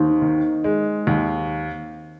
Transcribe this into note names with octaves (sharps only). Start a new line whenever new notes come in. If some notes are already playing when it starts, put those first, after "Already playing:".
Already playing: D#2 C4 D#4
D#3
G#3
D#2